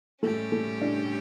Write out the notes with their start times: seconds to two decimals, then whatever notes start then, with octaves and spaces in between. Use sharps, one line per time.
0.23 A2 G3 A3 C#4 G4
0.52 A3
0.82 D4